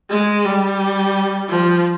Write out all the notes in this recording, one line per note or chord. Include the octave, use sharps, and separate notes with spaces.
G#3
G3
F3